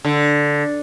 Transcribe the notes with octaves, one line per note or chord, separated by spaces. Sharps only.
D3